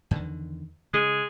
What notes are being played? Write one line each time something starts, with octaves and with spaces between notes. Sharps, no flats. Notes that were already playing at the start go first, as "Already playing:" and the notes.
E2 D3 D#3
C#3 G#3